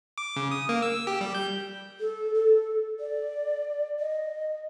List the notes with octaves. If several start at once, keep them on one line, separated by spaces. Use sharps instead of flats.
D6
C#3
D#6
A#3
E6
G4
G3
G6
A4
A4
D5
D#5